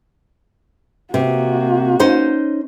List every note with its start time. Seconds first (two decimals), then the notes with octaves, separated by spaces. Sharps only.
1.14 C3 A#3 F#4
1.99 C#4 D#4 C5